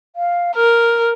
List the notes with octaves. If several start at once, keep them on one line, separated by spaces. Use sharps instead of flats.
F5
A#4 F6